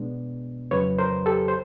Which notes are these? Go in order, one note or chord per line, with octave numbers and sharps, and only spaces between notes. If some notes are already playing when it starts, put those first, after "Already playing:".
Already playing: B2 G#3 B3 D4
F2 C#3 F#3 B4 C#5
A#4 C5
G4 A4
C5